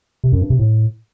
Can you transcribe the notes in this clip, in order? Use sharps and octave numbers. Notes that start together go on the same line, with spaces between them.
C3
F#2
G2
C3
A2